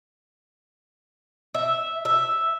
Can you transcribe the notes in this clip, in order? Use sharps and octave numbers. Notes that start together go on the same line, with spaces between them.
E5
E5